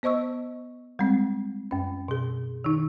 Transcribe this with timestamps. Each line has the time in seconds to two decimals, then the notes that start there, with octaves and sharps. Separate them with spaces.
0.03 B3 C5 D#5 C#6 E6
0.99 G3 G#3 C4
1.71 F#2 C#4
2.08 B2 G#4
2.64 D#3 D#4